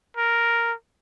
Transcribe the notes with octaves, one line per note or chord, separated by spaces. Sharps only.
A#4